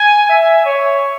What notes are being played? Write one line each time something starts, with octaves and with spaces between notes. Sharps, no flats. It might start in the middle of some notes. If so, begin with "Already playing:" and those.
Already playing: G#5
E5
C#5